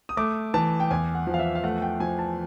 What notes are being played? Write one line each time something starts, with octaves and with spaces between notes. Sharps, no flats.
D#6
A3 D6
E3 A5
G5
E2 G#5
F#5
F3
F5
E5
F5
A3 F#5
G5
F3 G#5
A5